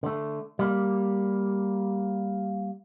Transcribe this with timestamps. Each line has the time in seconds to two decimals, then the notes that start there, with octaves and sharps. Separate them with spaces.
0.03 D3 A3
0.59 G3 A#3